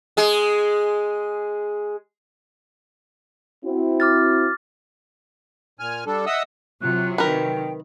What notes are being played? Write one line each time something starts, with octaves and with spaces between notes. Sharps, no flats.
G#3 G#4
C4 E4 F#4
D6 F6 A6
A#2 G#5 F6
G3 D4 A4
D#5 E5 F#5 D#6 E6
C3 F#3 F4 F#6
D#3 A#4 B4 G5